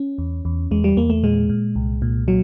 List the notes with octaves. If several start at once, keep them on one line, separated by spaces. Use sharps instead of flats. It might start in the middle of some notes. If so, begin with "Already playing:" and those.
Already playing: C#4
E2
E2
E2 G#3
G3
E2 A#3
A3
A#2 G#3
A#2
C2
A#2
A#2 F#3